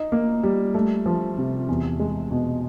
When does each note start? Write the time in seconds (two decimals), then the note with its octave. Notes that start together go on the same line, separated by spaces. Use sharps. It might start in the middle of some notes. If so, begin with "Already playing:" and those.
Already playing: D#4
0.12 A#3
0.43 G3
0.74 A3
1.06 F3
1.38 C3
1.69 E2
2.00 G#3
2.31 B2